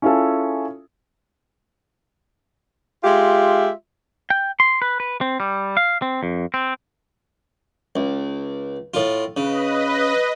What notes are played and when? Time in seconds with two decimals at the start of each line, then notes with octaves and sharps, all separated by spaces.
0.02 C#4 E4 F4 G#4 A4
3.04 G#3 F4 G4 E5
4.30 G5
4.60 C6
4.82 B4
5.00 B4
5.21 C4
5.40 G3
5.77 F5
6.02 C4
6.23 F2
6.54 C4
7.96 C#2
8.94 A2 F4
9.37 C#3 B4 D#5